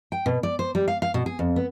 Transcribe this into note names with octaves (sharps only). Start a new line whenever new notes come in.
G5
B2
D5
C5
G3
F5
F5
B2
G#4
F2
B3